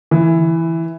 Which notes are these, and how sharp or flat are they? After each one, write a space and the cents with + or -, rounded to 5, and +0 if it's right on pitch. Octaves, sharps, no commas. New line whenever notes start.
E3 +0